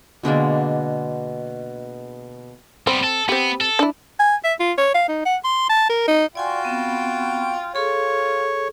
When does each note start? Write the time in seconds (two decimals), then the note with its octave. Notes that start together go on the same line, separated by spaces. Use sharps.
0.23 B2 D3 G#3 A#3
2.87 G3 B3 C4
3.04 A4
3.29 B3 C4 G4
3.61 A4
3.79 D4 E4
4.19 G#5
4.44 E5
4.60 F4
4.78 C#5
4.95 F5
5.08 D#4
5.26 F#5
5.44 C6
5.69 A5
5.89 A#4
6.08 D#4
6.35 F4 F#4 D5 G5 G#5 C6
6.65 B3 C4 B5
7.75 F4 G#4 A4 C#5